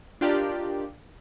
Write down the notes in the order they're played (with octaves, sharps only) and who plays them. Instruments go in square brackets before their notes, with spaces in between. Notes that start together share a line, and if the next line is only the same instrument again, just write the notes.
[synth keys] D4 F4 G4 A#4 D5 D#5